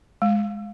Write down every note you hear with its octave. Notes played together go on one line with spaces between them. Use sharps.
G#3